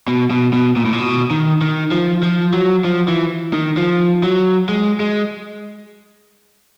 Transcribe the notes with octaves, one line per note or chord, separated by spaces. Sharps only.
B2
B2
B2
A#2
A2
A#2
B2
D#3
D#3
F3
F3
F#3
F3
E3
D#3
F3
F#3
G#3
G#3